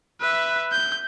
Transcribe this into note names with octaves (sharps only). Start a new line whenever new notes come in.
B4 E5
G6